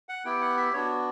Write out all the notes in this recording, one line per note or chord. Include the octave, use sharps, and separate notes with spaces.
F#5
B3 E4 G4 G5
F#5
E5
B3 D4 F#4 C#5